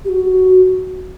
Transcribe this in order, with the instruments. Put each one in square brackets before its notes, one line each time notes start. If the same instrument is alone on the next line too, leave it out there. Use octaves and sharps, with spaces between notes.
[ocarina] G4
F#4